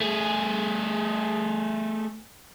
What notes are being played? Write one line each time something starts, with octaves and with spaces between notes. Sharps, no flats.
A3 G#4